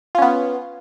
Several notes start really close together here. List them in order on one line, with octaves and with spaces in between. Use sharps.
F4 C#4 B3